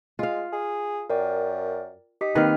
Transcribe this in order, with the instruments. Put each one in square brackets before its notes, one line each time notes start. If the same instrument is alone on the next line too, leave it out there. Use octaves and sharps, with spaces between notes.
[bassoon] G#3 [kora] F4 F5
[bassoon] G#4
[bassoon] F#2 [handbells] A#4 D5 G5
[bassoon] D#4 [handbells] G4 B6
[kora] D#3 B4 [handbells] A#3 C4 F6